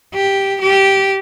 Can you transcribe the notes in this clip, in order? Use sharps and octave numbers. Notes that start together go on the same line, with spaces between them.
G4
G4